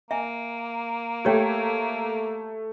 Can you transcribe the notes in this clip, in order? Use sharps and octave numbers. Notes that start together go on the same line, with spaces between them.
A#3 E5 G#5
A3 G4 C#5 G5 G#6